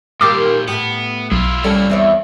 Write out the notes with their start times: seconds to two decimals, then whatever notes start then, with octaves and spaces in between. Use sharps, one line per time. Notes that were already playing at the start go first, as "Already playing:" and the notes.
0.21 A#2 D#3 A#3 G4 C5 D6 E6 A6
0.68 A2 B3 G4
1.32 B1 E4 F4
1.64 A2 G3 A#3 C#4 A4
1.90 E2 C4 E4 C#5